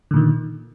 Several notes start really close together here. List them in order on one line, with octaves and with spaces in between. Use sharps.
D3 A#2 D#3